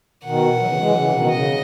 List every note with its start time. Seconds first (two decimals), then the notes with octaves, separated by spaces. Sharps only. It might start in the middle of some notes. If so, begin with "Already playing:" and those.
0.24 B2 D#3 F#5
0.51 E3
0.59 F#3
0.66 C#3 E3
0.78 E3 G#3
0.89 F#3
0.95 C#3 E3
1.12 B2 D#3
1.31 C#3 D#5